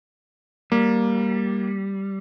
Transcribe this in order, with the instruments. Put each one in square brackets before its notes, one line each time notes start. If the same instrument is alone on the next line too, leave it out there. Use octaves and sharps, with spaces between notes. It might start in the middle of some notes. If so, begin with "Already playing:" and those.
[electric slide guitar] G3 [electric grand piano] A#3